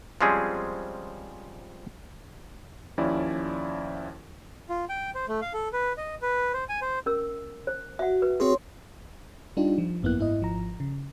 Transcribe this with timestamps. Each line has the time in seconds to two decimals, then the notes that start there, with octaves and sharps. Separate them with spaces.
0.21 F3 G3 G#3 C4 C#4 G#4
2.98 D#2 F3 C#4 E4 D5
4.69 F4
4.89 G5
5.15 C5
5.28 A3
5.42 F5
5.54 A4
5.73 B4
5.97 D#5
6.22 B4
6.53 C5
6.69 G#5
6.82 C5
7.06 C#4 A#4 E6
7.67 C5
7.99 F#4 E5 F#5
8.22 B4
8.40 C4 F#4 G#4 C#5 C6
9.57 G3 D4 D#4 F4 G4
9.78 F3
10.02 G#1 F#2 A#3 B3 E4 F#6
10.19 G#2 E4 D#5
10.40 G#1 F3 A#5
10.80 C#3